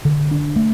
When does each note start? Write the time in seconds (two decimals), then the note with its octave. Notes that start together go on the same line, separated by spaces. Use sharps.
0.05 D3
0.31 D4
0.56 A3